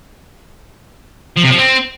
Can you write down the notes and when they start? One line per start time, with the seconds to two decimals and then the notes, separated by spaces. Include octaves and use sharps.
1.37 F3
1.44 C3
1.51 F3
1.58 C4